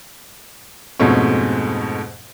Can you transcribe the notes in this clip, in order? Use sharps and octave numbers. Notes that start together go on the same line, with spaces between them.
F2 G#2 B2 A3 C#4